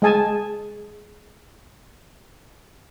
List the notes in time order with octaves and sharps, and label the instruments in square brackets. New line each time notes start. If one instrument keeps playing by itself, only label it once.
[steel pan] G#3 D#5 G#5 A5